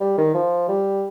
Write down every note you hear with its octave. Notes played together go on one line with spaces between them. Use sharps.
G3
D#3
F3
G3